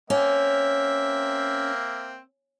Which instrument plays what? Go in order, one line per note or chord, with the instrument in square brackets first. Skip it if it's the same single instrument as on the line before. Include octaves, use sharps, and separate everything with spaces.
[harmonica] A#3 C4 E5 [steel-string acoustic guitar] C#4